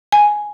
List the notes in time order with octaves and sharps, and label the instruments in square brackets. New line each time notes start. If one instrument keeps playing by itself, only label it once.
[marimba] G#5